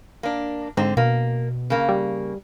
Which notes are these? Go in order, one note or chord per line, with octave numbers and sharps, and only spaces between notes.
A#3 D4
G#2 D3 C4
B2 A#3
C#3 A#3
G3